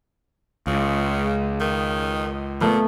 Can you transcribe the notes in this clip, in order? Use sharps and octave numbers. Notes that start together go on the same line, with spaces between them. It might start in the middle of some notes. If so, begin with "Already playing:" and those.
C#2 C#3
D#3
A#2 A3 B3